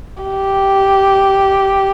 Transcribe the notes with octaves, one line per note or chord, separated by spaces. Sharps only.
G4